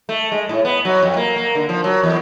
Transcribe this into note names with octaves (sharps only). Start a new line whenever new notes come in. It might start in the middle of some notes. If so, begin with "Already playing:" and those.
A3
G#3
A2
B3
F#3
F2
A#3
A#3
D3
F3
F#3
E2